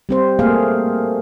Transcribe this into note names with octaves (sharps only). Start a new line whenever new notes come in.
G3 C4 C5
A3 A#3 G#4 F5